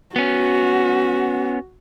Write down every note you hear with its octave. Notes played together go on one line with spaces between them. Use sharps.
B3 C#4 F#4